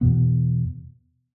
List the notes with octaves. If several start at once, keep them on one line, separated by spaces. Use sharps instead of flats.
E2 B2 B3